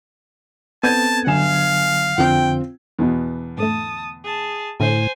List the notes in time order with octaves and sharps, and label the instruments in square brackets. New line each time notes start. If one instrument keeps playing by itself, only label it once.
[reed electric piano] B3 C4 A4 [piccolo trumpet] A5 [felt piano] G6 G#6 D#7
[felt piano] G1 G#5 E7 [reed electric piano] D3 F#3 [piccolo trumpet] F5
[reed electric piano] F2 D3 [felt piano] C4 F4 [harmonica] G5
[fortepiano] E2 B2
[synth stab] G#2 D3 A3 [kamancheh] A5 D#6
[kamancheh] G#4 A5
[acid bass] A2 [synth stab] D3 [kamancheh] C5 G#5